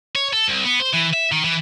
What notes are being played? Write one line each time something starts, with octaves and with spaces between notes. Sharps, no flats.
C#5
A4
C2
B3
C5
E3
E5
D#3
E3